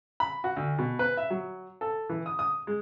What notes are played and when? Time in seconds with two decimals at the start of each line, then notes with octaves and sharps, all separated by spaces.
0.20 B5
0.44 F#4
0.57 D2
0.78 B2
0.99 B4
1.17 E5
1.30 F#3
1.81 A4
2.09 E3
2.26 D#6
2.39 D#6
2.67 G#3